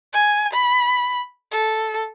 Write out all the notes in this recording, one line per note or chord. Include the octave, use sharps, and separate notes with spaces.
G#5
B5
A4